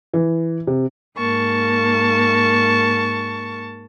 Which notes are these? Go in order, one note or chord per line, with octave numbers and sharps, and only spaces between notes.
E3
C3
G#2 A#3 A5 C#6